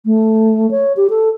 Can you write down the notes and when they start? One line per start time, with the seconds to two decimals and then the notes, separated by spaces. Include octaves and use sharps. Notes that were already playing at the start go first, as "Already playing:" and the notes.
0.06 A3
0.71 C#5
0.97 G4
1.10 A4